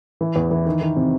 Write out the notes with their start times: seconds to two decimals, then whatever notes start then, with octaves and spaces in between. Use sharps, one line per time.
0.21 E3
0.36 E2
0.51 E3
0.66 D#3
0.81 D#3
0.96 C3